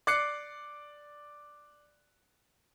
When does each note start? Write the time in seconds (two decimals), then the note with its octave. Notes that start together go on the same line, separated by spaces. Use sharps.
0.07 D5 D6 F#6 C7 C#7